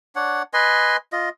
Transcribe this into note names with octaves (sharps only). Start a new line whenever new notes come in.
D4 C#5 F#5
B4 D#5 G#5 C6
F4 D#5